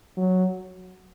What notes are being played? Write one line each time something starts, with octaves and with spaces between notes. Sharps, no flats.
F#3